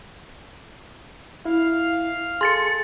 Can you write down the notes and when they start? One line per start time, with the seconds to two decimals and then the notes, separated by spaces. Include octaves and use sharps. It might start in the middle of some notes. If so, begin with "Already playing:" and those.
1.45 E4 F5
2.41 G#4 A4 C6 A6 C#7